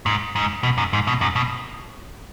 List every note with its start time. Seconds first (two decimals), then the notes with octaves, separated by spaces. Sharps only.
0.06 G#2
0.36 G#2
0.63 B2
0.78 F#2
0.93 G#2
1.07 B2
1.21 F#2
1.36 B2